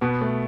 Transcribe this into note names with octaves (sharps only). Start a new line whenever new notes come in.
B2 B3
A3